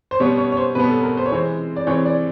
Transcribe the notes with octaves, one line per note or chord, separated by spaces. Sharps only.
C5
B2 G3 B3 C#5
C#5
C#5
C5
B2 G3 B3 B4
A4
A#4
C5
C#5
C3 E3 G#3 C4 C5
D5
C3 E3 G#3 C4 C#5
D5